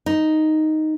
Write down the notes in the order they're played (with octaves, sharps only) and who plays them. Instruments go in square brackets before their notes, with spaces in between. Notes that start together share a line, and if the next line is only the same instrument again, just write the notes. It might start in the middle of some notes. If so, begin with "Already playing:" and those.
[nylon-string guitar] D#4